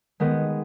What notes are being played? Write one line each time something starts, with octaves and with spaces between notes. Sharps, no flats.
D#3 G#3 B3